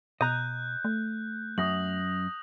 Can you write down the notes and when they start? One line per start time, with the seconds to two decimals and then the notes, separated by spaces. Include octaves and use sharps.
0.21 B2 D#5 A#5 F#6 G6
0.85 A3
1.58 F#2 D#6 A#6 F#7